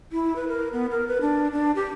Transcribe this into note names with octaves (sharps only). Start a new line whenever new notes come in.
E4
B4
A#4
B3
A#4
B4
D4
D4
G4